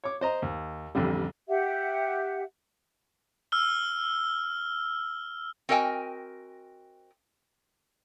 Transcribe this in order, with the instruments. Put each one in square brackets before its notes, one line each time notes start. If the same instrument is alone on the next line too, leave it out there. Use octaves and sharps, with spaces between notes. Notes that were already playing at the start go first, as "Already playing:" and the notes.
[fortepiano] C#5 D6
C5 D#5 A#5
D#2
A1 F2 D3 G3
[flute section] G4 E5 F#5
[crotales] E6 F6 G7
[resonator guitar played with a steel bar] C4 F#4 A#4 D#5 G5 G#5